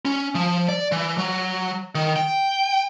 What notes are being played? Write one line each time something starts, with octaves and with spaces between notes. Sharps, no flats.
C#4
F3
D5
E3
F#3
D#3
G5